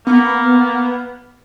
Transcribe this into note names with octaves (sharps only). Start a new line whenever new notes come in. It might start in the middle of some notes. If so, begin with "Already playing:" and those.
A#3 B3